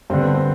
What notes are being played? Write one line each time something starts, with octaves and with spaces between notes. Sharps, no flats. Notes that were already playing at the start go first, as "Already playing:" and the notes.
G2 D3 C4
B3
C4